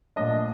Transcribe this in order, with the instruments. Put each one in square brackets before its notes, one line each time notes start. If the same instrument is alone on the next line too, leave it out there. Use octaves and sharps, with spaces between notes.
[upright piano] A#1 A#2 A3 D4 D#5